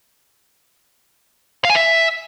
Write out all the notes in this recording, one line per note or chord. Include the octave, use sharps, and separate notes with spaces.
F5
G#5
E5